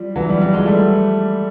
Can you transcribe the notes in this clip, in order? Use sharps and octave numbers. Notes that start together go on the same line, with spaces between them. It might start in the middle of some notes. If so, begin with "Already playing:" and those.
Already playing: F3 G3
E3 F#3
F3 G3
F3 G3
F#3 G#3
G3 A3